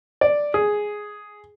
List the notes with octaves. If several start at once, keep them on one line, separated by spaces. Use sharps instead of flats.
D5
G#4